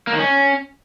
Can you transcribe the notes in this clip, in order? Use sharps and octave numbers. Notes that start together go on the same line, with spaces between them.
A#3
D#3
C#4